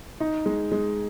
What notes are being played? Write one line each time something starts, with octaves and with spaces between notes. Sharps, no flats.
D#4
G#3
G#3